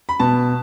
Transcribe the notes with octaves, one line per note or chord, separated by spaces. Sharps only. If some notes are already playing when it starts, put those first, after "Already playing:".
B5
B2 A5